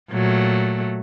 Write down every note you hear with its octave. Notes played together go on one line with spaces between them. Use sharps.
A#2 F#3 A3